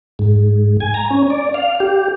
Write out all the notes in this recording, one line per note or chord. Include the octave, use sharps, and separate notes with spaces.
G#2
G#5
A#5
C#4
D5
F5
G4